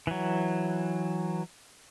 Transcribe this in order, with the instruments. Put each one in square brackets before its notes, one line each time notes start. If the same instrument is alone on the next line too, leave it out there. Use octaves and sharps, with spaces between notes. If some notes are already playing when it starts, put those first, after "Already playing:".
[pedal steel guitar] E3 F#3